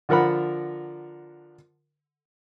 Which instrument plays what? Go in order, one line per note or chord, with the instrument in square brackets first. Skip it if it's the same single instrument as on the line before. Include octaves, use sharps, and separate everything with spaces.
[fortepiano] D3 F3 A#4 F#5 B5